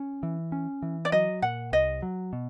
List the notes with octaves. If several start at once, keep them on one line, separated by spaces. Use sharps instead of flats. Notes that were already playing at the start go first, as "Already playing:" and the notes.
Already playing: C#4
E3
C#4
E3
D5
F#3 D#5
A#2 F#5
C2 D#5
F#3
B2